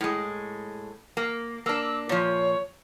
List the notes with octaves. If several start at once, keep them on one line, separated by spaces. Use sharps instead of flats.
A2 G#3
A#3
A#3 D4 E6
A#2 F3 C#5